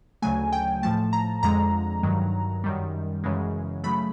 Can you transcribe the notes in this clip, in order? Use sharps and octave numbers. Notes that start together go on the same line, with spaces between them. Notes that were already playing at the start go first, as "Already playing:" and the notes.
D2 C#3 F#3 A3 G#5
G5
A2 F3 A3 A5
A#5
F2 D3 F3 G#3 A#5
G2 D#3 F#3
F#2 D#3 G3
F#2 C#3 E3 G#3
C#3 F#3 A3 B5